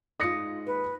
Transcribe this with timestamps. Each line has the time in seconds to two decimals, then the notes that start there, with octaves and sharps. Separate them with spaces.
0.20 G#2 D#4 F4 D#6 A#6 C#7
0.67 D#2 B4